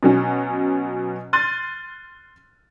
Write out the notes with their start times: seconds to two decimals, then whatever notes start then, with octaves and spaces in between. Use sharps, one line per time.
0.03 B2 F#3 C#4
1.33 C6 F6 F#6 A6 D#7